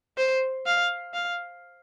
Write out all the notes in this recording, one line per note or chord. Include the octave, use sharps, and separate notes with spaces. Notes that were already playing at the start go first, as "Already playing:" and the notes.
C5
F5
F5